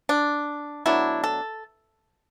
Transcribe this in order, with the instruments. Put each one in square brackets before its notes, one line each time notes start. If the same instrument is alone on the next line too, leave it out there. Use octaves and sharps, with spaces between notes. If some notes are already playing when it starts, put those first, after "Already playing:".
[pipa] D4
B2 F#3 A3 D4 E4
A4